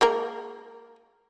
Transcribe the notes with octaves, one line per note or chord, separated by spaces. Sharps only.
G#3 A#3 A#4